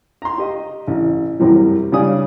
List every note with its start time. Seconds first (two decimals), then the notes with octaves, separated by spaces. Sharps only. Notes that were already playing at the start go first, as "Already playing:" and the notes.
0.22 A#5 C6
0.38 G4 D#5
0.87 A1
1.40 F#2 A2 C3 E3 G3
1.92 C#3 G3 D4 D5 G#5 D#6